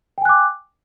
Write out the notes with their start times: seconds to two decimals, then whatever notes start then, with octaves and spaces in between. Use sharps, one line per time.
0.18 G5
0.22 G#5
0.25 F#6
0.29 D6